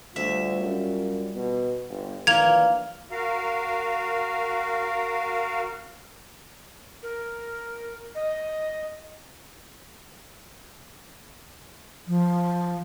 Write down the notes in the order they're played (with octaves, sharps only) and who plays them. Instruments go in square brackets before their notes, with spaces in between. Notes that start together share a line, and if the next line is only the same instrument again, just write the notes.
[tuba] D2 [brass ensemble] G3 F4 [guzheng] E5
[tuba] F#2
B2
G1
[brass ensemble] A#1 A#2 E3 [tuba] D#3 [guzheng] A#3 [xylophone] G#6 F7
[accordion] F#4 A#4 F5
[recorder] A#4
D#5
[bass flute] F3